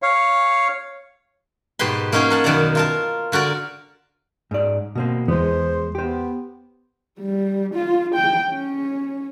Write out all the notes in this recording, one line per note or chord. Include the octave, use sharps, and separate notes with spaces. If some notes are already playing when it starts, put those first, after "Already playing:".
C#5 F5
G#2 B2 G4 B4 C6
A#3 C#4 D#4 F#4 G#4
A#4 F#5 A5
F#2 B2 D#3 A#4 D5 A#5
F4 A#4 A5
D3 F#4 A#4 D5
G#2 D5
B2 A#3 C4
E2 G#3 B3 C5
B3 G4 C5
G3
F4
G5
C#4